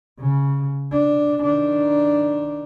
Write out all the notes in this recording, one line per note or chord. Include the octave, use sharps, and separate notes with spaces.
C#3
D4
D#3 D4